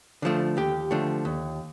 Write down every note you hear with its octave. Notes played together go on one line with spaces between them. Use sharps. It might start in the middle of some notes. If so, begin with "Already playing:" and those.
D3 F3 A3
D#2 G4
D3 F3 A3
D#2